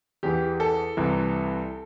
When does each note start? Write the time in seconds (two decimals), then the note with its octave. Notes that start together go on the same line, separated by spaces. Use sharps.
0.23 E2 E3 G4
0.60 A4
0.97 C2 C3 E3